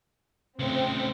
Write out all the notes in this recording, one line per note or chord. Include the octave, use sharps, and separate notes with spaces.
C#3 A3 C4